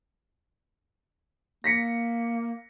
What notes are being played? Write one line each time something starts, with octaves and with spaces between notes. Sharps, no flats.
A#3 A#6 B6 C#7